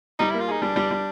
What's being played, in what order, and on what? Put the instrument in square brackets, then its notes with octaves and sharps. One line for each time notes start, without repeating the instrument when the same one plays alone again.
[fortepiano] G3 [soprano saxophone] D#4
[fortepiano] A#3 [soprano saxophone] E4
[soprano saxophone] F4
[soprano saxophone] D#4 [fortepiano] G#4
[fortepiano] G3 [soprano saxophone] D4
[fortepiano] G3
G3